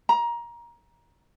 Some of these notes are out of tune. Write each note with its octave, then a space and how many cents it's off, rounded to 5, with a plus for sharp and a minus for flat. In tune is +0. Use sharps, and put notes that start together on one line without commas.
A#5 +20